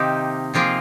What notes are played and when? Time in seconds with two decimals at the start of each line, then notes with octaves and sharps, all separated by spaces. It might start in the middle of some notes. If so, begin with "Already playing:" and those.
Already playing: C3 D#3 A#3 D#4 G4
0.54 C3 F3 A#3 F4 G#4